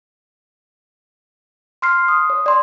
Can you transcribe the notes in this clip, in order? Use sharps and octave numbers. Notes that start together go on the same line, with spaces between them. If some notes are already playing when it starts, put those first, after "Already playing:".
C6 F6 C7
D#6
C#5
D5 C6